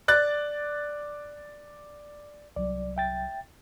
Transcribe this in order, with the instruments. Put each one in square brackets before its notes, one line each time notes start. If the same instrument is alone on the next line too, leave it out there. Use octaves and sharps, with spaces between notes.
[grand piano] D5 F#6 A6
[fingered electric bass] C2 F#3 [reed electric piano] D5
[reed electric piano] E5 G5 A6